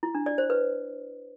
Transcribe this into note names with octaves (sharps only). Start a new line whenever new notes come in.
E4
D4
D5
C5
B4